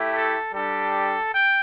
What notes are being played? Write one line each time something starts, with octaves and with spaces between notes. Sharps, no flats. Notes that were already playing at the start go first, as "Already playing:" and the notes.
Already playing: A3 E4 G4
A4
G3 D4 G4 A4
G5